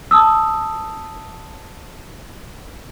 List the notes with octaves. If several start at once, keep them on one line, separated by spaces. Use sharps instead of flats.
A5 D#6 E6